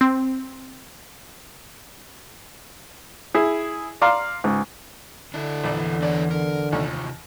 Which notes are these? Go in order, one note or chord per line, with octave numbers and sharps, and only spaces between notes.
C4
E4 G#4
D5 F5 A#5 C6
C#2 G#2
D3 D4 E4
A#1 E2 E3 D5
D4 B4 C#5 D5
D3 A#4
D#2 C3 D#3 F4